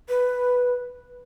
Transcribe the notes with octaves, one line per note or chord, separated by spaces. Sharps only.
B4